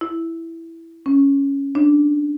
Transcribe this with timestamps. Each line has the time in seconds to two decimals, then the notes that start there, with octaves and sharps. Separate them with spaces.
0.01 E4
1.06 C#4
1.75 D4